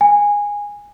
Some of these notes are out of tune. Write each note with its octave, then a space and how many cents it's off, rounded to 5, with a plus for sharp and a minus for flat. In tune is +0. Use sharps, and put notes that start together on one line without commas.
G#5 -15